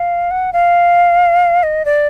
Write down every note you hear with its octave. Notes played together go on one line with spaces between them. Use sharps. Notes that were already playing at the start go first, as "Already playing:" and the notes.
Already playing: F5
F#5
F5
D#5
D5